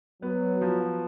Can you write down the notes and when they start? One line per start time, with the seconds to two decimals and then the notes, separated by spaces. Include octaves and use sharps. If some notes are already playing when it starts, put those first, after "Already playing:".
0.22 F#3 B3
0.61 F3